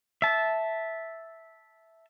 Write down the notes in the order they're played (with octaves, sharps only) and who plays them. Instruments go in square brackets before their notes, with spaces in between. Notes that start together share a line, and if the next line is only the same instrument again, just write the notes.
[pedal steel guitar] E5 A5